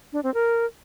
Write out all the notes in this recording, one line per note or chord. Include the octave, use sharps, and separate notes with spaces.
D4
C4
A#4